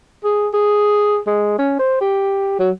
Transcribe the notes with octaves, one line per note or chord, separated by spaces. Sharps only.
G#4
G#4
G#3
C#4
C5
G4
F#3